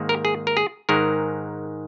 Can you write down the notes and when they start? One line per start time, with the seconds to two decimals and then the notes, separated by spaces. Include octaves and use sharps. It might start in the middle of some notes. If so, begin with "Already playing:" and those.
Already playing: G#2 D#3 A#3
0.09 A#4
0.25 G#4
0.47 A#4
0.57 G#4
0.89 G#2 D#3 G#3 A#4